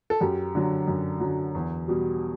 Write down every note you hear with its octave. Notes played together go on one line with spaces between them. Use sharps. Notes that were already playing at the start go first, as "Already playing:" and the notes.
A4
F#2 G4
D3 F#3
F#2
D3 F#3
E2
B2 G3